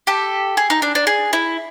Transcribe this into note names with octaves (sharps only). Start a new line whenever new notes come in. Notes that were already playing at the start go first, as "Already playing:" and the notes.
G4 A4
G#4
D#4
D4
D4
G#4
E4